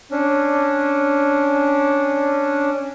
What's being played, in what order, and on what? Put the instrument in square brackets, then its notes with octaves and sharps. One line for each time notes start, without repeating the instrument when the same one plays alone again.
[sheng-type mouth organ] C#4 D4